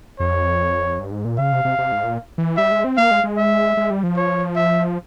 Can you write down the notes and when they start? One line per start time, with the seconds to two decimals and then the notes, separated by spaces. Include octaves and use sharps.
0.19 F2 C#5
0.99 G2
1.12 G#2
1.25 A#2
1.38 C#3 F5
1.52 C3
1.65 C3
1.79 C3
1.92 G#2
2.04 A#2
2.38 E3
2.57 G3 E5
2.71 G#3
2.84 C4
2.97 A#3 F5
3.11 G#3
3.24 G#3
3.37 E5
3.77 G#3
3.90 G3
4.03 F3
4.16 C#5
4.56 E5